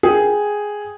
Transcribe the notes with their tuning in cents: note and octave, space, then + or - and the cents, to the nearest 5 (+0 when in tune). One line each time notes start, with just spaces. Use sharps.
G#4 +0 G5 +0